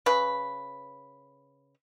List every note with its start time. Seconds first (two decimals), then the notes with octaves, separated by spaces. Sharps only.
0.06 C#3 B4